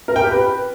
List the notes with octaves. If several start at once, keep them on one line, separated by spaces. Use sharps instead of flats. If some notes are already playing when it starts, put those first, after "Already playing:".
A#4
G5
G4
B4